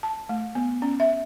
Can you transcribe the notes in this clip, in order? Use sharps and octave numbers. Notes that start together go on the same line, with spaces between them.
A5
A3
B3
C#4
E5